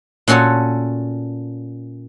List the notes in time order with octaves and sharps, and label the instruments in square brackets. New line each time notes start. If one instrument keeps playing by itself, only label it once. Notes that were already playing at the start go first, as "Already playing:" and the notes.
[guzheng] A#2 C#4 F#4 A4 C#5